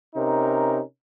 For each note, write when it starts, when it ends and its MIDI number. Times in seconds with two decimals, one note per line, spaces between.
0.15 0.82 48
0.15 0.82 61
0.15 0.82 63
0.15 0.82 70